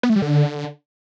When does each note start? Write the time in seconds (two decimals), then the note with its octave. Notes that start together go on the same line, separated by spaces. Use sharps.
0.03 B3
0.10 A3
0.16 G3
0.22 D3